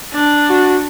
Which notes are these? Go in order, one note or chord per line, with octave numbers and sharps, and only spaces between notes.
D4
F#4